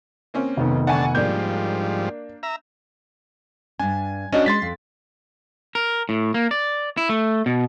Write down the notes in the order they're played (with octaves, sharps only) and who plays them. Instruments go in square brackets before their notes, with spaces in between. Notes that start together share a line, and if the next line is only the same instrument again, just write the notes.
[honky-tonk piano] A#3 C4 C#4
[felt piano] F1 D#3 B3
[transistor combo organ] D3 A5 [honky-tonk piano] F#5 G#5 C#6
[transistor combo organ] G#2 F3 G3 [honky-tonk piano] A#3 D4 [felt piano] G6
[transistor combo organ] E5 A#5
[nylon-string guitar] G2 D4 [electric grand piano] G#5
[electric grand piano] C#4 D4 F#4 [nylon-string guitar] D#5
[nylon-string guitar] G#3 [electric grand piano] C6 A6 B6
[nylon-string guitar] F2
[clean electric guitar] A#4
A2
A#3
D5
E4
A3
B2